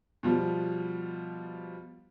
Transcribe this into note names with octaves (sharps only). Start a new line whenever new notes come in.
B2 F3 G3